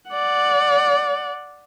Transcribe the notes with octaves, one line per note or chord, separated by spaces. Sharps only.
D5 F#5